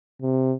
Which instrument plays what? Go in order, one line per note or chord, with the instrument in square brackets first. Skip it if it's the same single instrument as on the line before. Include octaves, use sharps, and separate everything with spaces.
[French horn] C3